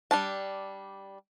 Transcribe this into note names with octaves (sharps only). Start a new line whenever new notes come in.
G3 D4 A5